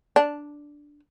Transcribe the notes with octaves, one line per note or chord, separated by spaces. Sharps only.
D4